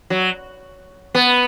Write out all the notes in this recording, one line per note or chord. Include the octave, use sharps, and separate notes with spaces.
F#3
B3